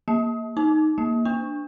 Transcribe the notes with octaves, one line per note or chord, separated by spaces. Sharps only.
A#3
D#4
A#3
D4